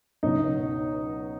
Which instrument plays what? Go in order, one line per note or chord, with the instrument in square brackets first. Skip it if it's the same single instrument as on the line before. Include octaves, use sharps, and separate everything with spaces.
[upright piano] C#2 B2 F#3 D#4